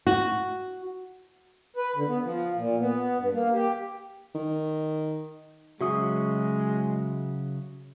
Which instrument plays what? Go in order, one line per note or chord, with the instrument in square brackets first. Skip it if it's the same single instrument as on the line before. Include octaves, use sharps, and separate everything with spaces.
[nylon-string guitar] F#4
[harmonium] B4
D3
B3
F3
A#2
B3
G2
A#3
G4
[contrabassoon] D#3
[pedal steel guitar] C#3 F#3 C#6 [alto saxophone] G#3 [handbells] F#4 E5 D#6